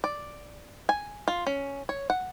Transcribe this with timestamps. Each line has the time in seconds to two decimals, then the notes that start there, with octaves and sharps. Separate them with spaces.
0.04 D5
0.89 G#5
1.28 F4
1.47 C#4
1.89 C#5
2.10 F#5